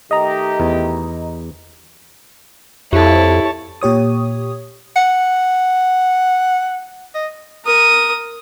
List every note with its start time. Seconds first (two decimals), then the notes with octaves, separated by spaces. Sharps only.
0.11 D#3 A3 G4 D#5 A#5
0.60 E2
2.93 F2 E4 G4 A4 C#5 A5
3.81 A#2 G4 C#5 D#6
4.96 F#5
7.15 D#5
7.65 A#4 D#6